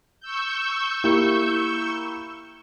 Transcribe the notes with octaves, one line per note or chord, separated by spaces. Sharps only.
C#6 E6 G6
A#3 E4 G4